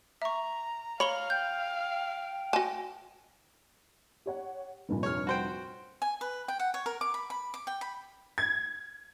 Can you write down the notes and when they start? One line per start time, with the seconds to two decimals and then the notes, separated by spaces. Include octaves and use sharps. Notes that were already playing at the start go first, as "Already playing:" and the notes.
0.22 E5 A#5 C#6
1.00 C#5 F5 B5 F#7 G7
1.30 G5 G6
2.53 F#4 G#5 A5
4.26 G4 C#5 F#5
4.89 F1 G2 A#2
5.03 C#5 F6
5.27 F#4 C5 G5
6.02 G#5
6.21 B4
6.48 G5
6.60 F#5
6.74 C#5
6.86 A#4
7.01 D6
7.14 B5
7.30 B5
7.54 D6
7.67 G5
7.81 B5
8.38 G#6